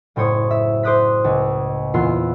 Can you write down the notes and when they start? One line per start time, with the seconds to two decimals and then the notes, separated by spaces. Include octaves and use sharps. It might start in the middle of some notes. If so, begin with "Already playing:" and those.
0.16 F#1 A2 C5 C#5 D#6
0.51 E5
0.83 C5 D6 D#6 F#6 B6
1.24 C#2
1.94 E2 A#2 B3 F4 E6 C7